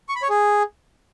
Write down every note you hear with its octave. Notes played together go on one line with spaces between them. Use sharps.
C#6
B5
C#5
G#4